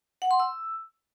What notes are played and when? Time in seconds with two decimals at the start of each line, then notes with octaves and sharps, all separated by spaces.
0.22 F#5
0.31 C6
0.40 E6